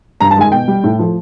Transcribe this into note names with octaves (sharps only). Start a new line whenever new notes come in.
G2 A#5
A5
D#3 G#3 G#5
B2 G5
G3
A2
F3 A3